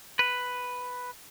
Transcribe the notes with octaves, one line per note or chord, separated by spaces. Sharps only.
B4